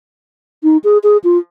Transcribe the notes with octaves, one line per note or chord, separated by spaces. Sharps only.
D#4
G#4
G#4
F4